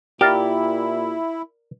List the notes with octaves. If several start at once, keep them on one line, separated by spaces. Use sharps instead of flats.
A#2 E4 G4 A#4 D5 F5